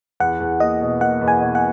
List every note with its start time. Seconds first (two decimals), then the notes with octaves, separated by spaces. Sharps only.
0.20 E2 F#5
0.40 E2
0.60 A#3 D#5
0.81 B2
1.01 A#3 F#5
1.21 E2
1.28 G#5
1.41 B2
1.55 F#5